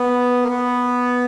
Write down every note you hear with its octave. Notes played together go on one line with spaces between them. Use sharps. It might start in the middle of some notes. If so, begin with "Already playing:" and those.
Already playing: B3
A#3
B3